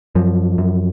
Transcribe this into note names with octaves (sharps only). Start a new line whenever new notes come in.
F#2 F3
F#2